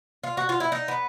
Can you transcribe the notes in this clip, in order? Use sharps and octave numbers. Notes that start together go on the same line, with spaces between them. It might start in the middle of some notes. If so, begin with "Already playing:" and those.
F4
F#4
F4
E4
D#4
B3